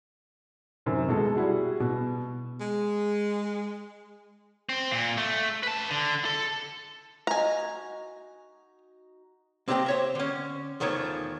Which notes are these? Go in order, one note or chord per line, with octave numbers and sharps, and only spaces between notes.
F#2 C3 D#3
B2 G#3 A4
G3 E4 F#4 G#4
B2
G#3
C4
A#2
A3
B4 A5
D3
A4
D#4 F#4 G#5 A#5
A#3 C4 D4 G4 D#5 G5
C5 C#5 E5
D3 C#4
E2 D#3 F3 A3 C#5